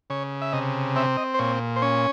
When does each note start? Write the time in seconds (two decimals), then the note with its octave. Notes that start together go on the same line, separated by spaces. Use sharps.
0.10 C#3 C#5
0.42 E5
0.53 C3 D#5
0.96 C4 E5
1.17 D#5
1.34 C5
1.39 A#2 C#5
1.76 C5
1.82 C#4 C#5